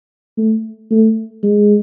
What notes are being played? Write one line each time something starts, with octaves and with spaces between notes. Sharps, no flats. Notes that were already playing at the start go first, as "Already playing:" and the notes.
A3
A3
G#3